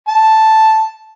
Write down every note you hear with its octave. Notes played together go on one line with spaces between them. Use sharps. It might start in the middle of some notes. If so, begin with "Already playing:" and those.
A5